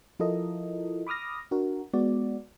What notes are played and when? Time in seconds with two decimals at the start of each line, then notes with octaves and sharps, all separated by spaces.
0.19 F3 E4 F4 A4 A#4 D#5
1.07 B5 D6 D#6 F6 A#6
1.51 D4 F#4 A#4
1.93 G#3 B3 F#4 D5